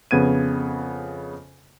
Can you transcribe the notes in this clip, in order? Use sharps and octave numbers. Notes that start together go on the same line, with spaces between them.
F2 C#3 B3 G#6 D#7